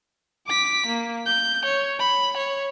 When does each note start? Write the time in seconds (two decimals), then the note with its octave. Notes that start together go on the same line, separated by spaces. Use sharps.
0.47 D6 B6
0.86 A#3
1.26 G6
1.65 C#5
2.00 B5
2.37 C#5